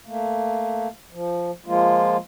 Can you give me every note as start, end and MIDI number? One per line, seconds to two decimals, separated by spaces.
0.06 0.88 57
0.06 0.88 58
1.12 1.51 53
1.66 2.17 53
1.66 2.17 56
1.66 2.17 58
1.66 2.17 65